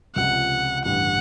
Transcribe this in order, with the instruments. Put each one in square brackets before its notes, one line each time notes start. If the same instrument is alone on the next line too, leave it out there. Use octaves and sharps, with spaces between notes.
[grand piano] C#2 C3 F3 [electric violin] F#5
[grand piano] A1 G2 D3 G3 [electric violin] F#5